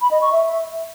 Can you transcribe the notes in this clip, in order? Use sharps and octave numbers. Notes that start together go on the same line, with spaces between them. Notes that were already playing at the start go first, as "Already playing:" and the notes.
B5
D#5
C#6
E5